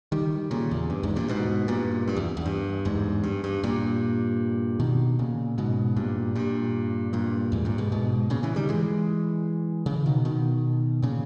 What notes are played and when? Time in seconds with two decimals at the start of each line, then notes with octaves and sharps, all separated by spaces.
0.12 D#3 G3
0.51 A#2 C#3
0.71 E2
0.90 G2
1.03 E2 G#2
1.16 G2 A#2
1.29 G#2 B2
1.68 G2 A#2
2.08 G2
2.16 E2
2.37 E2
2.46 G2
2.85 E2 G#2
3.23 G2
3.44 G2
3.64 G2 A#2
4.80 B2 D#3
5.19 A#2 C#3
5.58 G#2 B2
5.96 G2 A#2
6.35 G2 A#2
7.13 G2 A#2
7.52 E2 G#2
7.65 G2 A#2
7.78 G#2 B2
7.92 G#2 B2
8.30 A#2 C#3
8.43 C#3 E3
8.56 D#3 G3
8.69 E3 G#3
9.86 C#3 E3
10.06 B2 D#3
10.25 B2 D#3
11.02 A#2 C#3